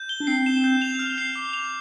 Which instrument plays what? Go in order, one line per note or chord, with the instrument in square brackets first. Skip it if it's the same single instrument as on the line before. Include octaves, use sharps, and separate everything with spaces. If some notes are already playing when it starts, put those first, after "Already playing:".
Already playing: [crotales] G6
G7
[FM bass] D4
[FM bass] C4 [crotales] C7
[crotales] E7
G6
F7
F6
C7
D6
F7